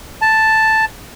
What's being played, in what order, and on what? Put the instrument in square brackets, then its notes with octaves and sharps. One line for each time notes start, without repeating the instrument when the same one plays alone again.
[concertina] A5